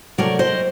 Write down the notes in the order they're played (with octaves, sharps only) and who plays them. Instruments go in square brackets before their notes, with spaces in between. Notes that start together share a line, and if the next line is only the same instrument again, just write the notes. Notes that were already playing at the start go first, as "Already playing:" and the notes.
[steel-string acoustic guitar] C3 F#3 A3 D4 A#4 D5
C5 D#5